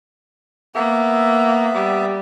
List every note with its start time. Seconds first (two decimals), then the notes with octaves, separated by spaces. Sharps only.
0.75 A#3 B3 E5
1.75 G3